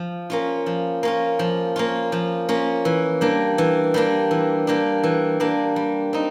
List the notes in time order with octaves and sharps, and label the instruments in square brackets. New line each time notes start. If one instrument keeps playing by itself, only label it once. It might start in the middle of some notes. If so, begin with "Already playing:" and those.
Already playing: [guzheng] F3
A#3 C#4 F4
F3
A#3 C#4 F4
F3
A#3 C#4 F4
F3
A#3 C#4 F4
E3
G3 A#3 D4
E3
G3 A#3 D4
E3
G3 A#3 D4
E3
G3 A#3 D4
G3
C4 D#4